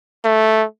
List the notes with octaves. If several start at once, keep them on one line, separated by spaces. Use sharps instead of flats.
A3